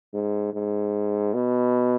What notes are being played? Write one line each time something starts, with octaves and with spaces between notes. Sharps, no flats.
G#2
G#2
B2